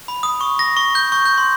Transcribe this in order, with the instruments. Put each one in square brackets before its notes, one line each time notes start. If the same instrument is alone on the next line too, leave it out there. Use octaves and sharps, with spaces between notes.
[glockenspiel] B5
D#6
C#6
A#6
C#6
G6
C#6
G6
C6